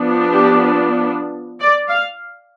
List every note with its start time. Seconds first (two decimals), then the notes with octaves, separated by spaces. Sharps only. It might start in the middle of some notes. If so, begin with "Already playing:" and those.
Already playing: F3 B3 D4
0.32 G4
1.61 D5
1.90 F5